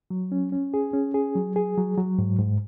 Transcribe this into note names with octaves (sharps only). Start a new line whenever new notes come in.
F#3
C#4
C#4
G#4
C#4
G#4
F#3
G#4
F#3
F#3
G#2
G#2